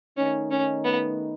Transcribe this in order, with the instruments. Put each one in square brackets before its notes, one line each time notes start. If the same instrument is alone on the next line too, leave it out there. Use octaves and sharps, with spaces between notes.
[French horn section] D#3 A3 D#4 [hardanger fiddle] C#4
[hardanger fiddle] C#4
B3